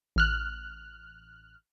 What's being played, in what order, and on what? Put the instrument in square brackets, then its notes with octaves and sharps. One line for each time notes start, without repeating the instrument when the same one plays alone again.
[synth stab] A1 F6 F#6